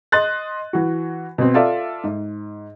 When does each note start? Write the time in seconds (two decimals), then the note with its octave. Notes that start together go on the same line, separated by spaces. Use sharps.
0.12 D#5 C6 F#6 A6
0.73 E3 F#4
1.38 B2 C4
1.54 F4 A4 D5 E5
2.04 G#2